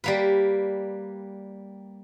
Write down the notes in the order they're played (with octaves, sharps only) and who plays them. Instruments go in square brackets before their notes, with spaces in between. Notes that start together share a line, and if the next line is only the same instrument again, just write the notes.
[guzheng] G3 A#3 B4